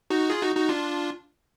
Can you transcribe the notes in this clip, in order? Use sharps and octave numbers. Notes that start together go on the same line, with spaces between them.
D#4 F#4
F4 G#4
D#4 F#4
D#4 F#4
D4 F4